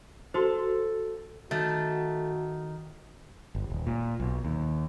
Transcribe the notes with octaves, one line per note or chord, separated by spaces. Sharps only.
F#4 A4 C5
D#3 A3 F#4
G1
D#1
A#2
B1
D#2